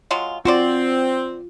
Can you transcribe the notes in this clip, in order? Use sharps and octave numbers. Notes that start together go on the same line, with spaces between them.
F#3 G#3 F4
C4 F4 F#4 C5 D5